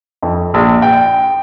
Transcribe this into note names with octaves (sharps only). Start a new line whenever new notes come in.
F2
A#1
G5